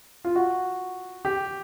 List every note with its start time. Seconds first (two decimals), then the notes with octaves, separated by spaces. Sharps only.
0.25 F4
0.36 F#4
1.25 G4